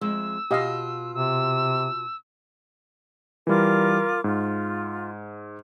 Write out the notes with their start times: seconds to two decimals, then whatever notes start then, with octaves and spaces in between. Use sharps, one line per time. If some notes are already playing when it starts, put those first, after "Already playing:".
0.01 F2 G#3 E5 E6
0.51 B2 F4 G4 D#5 F5
1.14 C3 E6
3.47 E3 G3 F4 A#4 D6
4.24 G#2 F4